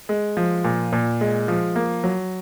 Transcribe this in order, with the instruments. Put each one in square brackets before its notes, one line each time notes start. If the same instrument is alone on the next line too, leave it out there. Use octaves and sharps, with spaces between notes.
[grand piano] G#3
F3
A#2
A#2
G#3
F3
A#3
F#3